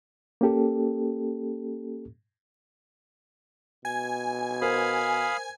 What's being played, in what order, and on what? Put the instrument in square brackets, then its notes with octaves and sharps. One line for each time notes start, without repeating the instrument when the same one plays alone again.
[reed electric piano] A#3 C#4 G4 A4
[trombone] B2 [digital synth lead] G#5
[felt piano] A#4 C5 [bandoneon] F5 B5 D#6